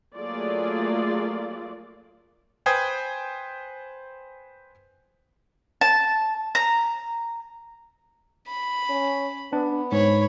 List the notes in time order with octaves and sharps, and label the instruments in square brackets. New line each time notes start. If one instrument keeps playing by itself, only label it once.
[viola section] F#3 A3 A#3 F4 G#4 D5
[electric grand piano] B4 C5 G5 G#5 D#6 G#6
[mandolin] A5
A#5
[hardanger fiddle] B5
[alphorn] C#4
[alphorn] B3 [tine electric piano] D4
[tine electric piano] G#2 [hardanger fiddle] C#5 B5